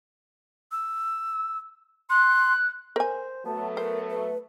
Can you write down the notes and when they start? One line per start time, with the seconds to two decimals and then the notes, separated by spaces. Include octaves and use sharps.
0.72 E6
2.10 C6 F#6
2.96 A#4 C5 G#5
3.46 F#3 A3 B3 A5
3.77 A#4 C5
4.10 B4